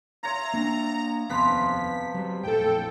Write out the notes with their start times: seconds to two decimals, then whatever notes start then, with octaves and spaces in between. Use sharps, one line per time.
0.23 F4 C#5 E5 A#5
0.54 A#3 D4
1.29 F1 D#2 C3 F3 B3 B4 B6
2.14 F#3 G3
2.43 A#1 F2 A2 A4 G5